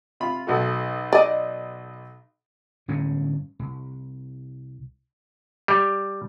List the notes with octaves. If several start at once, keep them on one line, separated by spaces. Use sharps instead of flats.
C3 F4 B5
B1 F#4 A4
D5 D#5
G1 A2 C#4
C2
G3